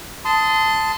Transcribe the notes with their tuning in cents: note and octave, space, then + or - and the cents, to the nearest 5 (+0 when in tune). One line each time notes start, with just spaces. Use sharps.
A5 +0 C6 -20 D#6 +10